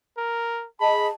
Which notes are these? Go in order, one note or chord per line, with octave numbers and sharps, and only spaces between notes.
A#4
G#4 D#5 A5 B5